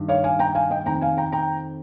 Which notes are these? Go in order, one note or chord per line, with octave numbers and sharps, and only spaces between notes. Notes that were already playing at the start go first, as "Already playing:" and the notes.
Already playing: G2 D#3
C#5 F5
F5 G#5
G5 A#5
F5 G#5
D#5 G5
F2 D#3 G5 A#5
F5 G#5
G5 A#5
G5 A#5